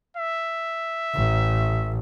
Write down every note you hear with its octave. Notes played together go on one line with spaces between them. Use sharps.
E5
A1